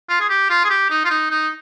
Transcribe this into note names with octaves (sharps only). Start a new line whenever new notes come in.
F4
G#4
G4
F4
G#4
G4
D#4
F4
D#4
D#4